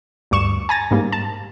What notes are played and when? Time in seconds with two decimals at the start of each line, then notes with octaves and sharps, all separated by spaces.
0.31 D2 G2 C#6 E7
0.69 G#5 A#5 A6
0.91 G#2 G3 A#3
1.12 A5